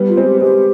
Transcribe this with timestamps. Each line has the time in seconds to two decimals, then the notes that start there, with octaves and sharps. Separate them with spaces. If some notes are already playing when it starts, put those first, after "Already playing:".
Already playing: G3 B3
0.09 F4
0.17 G#3 C4
0.24 G4
0.41 G#3 C4 G4